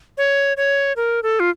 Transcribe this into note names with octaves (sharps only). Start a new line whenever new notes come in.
C#5
C#5
A#4
A4
F4